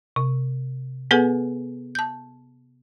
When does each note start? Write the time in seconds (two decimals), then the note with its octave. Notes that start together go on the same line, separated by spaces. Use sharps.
0.16 C3
1.11 B3 G#4 A4 B4 F#5 G#5
1.95 A5 G6